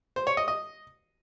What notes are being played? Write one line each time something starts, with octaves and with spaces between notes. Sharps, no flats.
C5
C#5
D#5
D#5